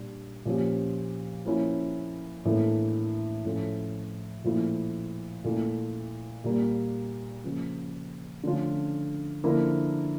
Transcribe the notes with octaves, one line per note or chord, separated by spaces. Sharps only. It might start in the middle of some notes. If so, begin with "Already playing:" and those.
Already playing: A#2 G3 D4
A#2 F3 C#4 G4
F3 A#3 C#4 E4
A2 E3 A#3 D4 A4
A2 F3 C#4 F4 A4
A#2 F3 A3 E4
A#2 A3 E4
A#2 G3 A#3
C#3 F3 A#3
D3 F3 A3 C#4 F4
D3 F3 A#3 E4 A#4